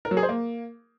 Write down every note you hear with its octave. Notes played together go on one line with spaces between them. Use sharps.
A#4
F#3
G#4
C5
A#3